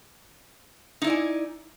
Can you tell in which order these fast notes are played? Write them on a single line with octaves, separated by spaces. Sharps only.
D#4 E4 D5 G#5